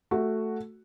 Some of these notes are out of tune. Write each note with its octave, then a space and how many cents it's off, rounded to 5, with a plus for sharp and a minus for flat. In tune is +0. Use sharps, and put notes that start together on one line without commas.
A3 +0 F#4 +0